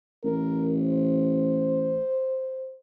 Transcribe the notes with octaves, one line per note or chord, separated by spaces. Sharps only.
A1 A#4
C5